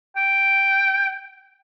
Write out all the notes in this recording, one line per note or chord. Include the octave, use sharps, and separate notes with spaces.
G5